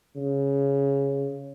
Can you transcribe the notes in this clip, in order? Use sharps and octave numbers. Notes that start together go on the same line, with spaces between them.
C#3